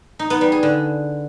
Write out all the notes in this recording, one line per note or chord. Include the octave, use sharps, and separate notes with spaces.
D#4
B3
G3
G#4
D3